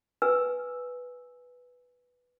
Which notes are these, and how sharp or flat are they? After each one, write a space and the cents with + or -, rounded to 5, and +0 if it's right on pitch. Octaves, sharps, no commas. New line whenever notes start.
B4 +0 G#5 +0 E6 +0